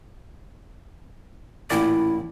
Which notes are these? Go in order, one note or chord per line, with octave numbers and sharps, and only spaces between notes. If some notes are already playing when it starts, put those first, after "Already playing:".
A1 A#2 E4 D5